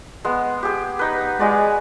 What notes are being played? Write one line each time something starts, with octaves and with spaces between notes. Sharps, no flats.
G#3 B3
G4 G#4
D#4 B4
G#3 F#4 D5